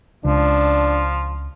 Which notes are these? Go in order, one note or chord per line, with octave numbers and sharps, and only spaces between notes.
C#2 C#3 F3 D4